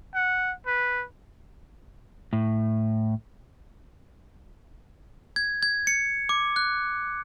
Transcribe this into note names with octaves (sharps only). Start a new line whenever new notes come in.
F#5
B4
A2
G#6
G#6
C#7
D6
F#6